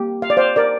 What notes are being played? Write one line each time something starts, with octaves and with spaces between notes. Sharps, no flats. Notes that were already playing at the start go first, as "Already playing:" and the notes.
Already playing: A#3 G4
F5
D5
C5 F5
A#4 D5